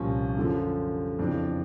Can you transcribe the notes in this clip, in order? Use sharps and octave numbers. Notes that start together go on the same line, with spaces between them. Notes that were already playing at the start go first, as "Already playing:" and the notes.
Already playing: C2 A#2 F3 C#4
F#2 D3 F3
F2 C#3 E3 D4